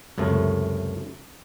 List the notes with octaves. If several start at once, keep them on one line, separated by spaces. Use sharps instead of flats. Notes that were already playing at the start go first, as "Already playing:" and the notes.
C#2 F#2 C3 A3